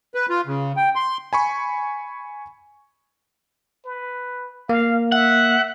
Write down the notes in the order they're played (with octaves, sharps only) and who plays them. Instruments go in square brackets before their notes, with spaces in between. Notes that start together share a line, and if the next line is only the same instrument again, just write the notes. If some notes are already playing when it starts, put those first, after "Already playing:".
[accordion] B4
F4
C#3
G5
C6
[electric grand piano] G#5 B5 C#6
[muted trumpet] B4
[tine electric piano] A#3 [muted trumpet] F5
[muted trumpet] E5 [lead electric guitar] F#5